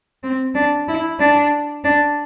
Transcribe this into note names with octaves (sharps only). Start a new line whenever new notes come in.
C4
D4
E4
D4
D4